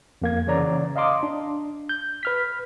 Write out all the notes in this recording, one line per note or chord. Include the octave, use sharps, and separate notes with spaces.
F2 A#3 G#6
C#3 E3 C#5 D5 A#5
D#5 F5 A#5 C6 D6 D#6
D4
G6
B4 F6 B6